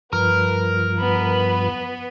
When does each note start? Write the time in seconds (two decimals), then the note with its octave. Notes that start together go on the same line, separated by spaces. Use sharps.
0.13 G2 F3 A#4 B4
0.98 B3 B4 B5